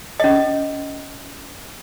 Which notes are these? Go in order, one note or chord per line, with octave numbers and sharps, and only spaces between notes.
C#4 D#5